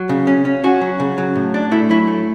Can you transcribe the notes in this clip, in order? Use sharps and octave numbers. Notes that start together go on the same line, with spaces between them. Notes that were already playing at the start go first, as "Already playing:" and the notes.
Already playing: F#3
C#3
C#4
C#4
C#4 F#4
F#3
C#3
F#3
A2
D4
A3 E4
F#3 E4
A3